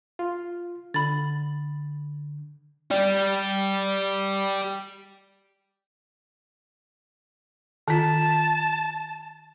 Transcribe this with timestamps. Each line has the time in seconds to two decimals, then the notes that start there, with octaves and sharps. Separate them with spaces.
0.19 F4
0.94 D3 B5 A6
2.91 G4 D5
7.88 D#3 F4 A5